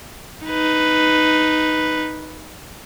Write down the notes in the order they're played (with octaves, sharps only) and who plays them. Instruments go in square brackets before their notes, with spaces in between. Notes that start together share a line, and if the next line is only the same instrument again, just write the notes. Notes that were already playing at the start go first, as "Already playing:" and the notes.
[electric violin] D#4 B4